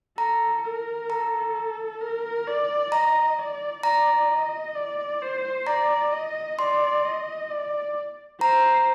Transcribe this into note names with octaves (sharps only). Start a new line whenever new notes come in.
A4 A#5
A#4
A4 A#5
A#4
D5
D#5 A#5
D5
D5 A#5
D#5
D5
C5
D5 A#5
D#5
D5 C6
D#5
D5
C5 A#5